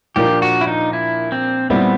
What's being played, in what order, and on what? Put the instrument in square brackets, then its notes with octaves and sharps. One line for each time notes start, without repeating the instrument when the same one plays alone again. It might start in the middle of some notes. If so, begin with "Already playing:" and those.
[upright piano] A#2 F3 A#3 D4 F4 [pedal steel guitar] G4
[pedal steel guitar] F#4
E4
D#4
E4
C4
[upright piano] A#2 G3 C4 E4 [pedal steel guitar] B3